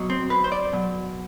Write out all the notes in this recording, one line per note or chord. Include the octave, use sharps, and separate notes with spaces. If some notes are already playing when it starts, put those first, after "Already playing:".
Already playing: B2 F#3
C4
B4
C5
D5
B2 F#3